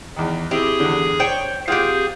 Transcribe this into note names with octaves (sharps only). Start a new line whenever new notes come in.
E2 D#3
C4 E4 G4 G#4
E2 D3
D4 C5 C#5 G5
C4 F4 G4 G#4 F#5